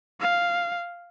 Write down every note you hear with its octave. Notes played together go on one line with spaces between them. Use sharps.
F5